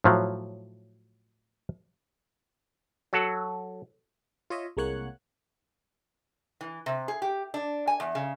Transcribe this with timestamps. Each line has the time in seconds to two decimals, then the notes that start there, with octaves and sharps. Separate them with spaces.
0.04 A2 F3 F#3
3.13 F#3 F#4 A4 F#5
4.50 F4 C#5 D#5 E5
4.77 C2 G#3 A#3 C#5 F#5 F#6
6.61 E3
6.86 C3
7.08 G#4
7.22 G4
7.54 D4
7.87 G#5
8.00 E2
8.15 C#3